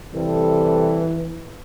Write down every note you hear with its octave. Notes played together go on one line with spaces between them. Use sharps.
C3 E3 G3 A4